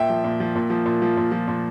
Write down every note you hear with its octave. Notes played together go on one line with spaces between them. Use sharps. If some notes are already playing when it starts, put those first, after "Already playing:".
Already playing: A#2 E5 G5
F3
A#2
F3
A#2
F3
A#2
F3
A#2
F3
A#2